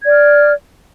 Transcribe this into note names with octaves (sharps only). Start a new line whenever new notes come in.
D5 F6 G#6